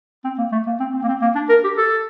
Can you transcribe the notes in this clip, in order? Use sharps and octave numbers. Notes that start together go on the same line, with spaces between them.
C4
A#3
A3
A#3
C4
C4
A#3
C4
A#3
D4
A#4
G4
A4